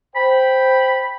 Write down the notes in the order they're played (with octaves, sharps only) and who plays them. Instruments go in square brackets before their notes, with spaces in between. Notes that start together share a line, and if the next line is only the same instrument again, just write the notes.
[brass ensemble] C5 G5 [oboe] B5